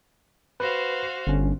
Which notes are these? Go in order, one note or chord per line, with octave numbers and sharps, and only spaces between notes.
F#4 B4 C5 F5
G1 D3 C#4